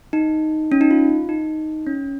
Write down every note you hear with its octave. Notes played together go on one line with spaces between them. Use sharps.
D#4
C#4
D#4
F4
D#4
C#4